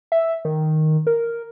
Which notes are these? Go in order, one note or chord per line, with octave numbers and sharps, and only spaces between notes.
E5
D#3
A#4